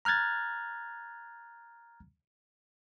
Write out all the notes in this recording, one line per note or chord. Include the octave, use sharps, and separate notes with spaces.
A#5 F6 F#6 G#6 A6